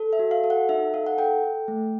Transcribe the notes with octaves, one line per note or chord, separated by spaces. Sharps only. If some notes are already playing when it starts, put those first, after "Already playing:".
Already playing: A4
E5
F#4
F5
A4
F#5
D#4 E5
A4 F5
F#5
A4 G5
A4
A3